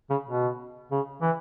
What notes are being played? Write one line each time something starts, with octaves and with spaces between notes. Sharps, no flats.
C#3
B2
C#3
E3